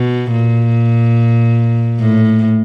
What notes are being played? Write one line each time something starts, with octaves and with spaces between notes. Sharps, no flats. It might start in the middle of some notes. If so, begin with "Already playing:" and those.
Already playing: B2
A#2
A2